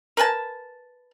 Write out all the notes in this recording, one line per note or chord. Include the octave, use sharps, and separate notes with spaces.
A#4 B4 G#5 A5